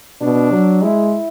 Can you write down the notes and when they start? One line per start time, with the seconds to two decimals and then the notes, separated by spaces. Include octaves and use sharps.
0.22 B2 D4
0.52 F#3
0.82 G#3 E4